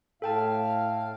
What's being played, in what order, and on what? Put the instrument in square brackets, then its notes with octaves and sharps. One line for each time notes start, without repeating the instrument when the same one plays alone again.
[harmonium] A2 F5 [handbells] A4 G5 A5